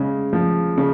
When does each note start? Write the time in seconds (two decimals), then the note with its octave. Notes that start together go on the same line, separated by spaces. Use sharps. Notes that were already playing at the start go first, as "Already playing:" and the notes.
Already playing: C#3 G#3
0.33 F3
0.78 C#3